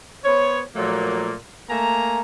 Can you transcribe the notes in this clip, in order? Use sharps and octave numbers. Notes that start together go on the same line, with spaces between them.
B3 C5 C#5
A#2 F3 F#3 A3 A#3
A3 A#3 G#5 A#5